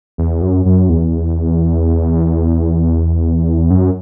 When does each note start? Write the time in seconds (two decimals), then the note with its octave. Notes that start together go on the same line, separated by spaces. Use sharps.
0.18 E2
0.42 F#2
0.66 F#2
0.89 E2
3.70 F#2